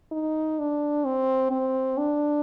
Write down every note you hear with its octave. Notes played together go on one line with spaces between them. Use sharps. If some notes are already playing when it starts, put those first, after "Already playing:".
D#4
D4
C4
C4
D4